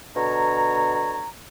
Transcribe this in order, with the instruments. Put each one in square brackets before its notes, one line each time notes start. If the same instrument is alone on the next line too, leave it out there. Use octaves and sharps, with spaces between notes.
[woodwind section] B2 D3 C#5 A#5